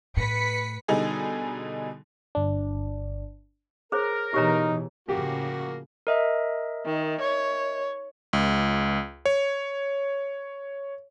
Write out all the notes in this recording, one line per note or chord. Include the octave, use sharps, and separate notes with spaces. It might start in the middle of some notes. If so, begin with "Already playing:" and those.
A2 B4 B6 C#7
B2 D3 G3 D#4 G#4
G1 D4
G#4 A#4 C5 C#5
B2 E3 D#4 G4 C#5 A#5
A2 C#3 F3 A#3 F#4 G4
A#4 D#5 E5
D#3
C#5
C#2
C#5